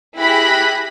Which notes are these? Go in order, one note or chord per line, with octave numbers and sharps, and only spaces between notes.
E4 G4 G#4 B5 F#6 A#6